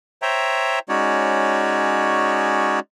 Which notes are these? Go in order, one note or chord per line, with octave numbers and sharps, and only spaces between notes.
C5 C#5 E5 G5 A#5
G#3 C#4 D#4 F#4 C#5 D5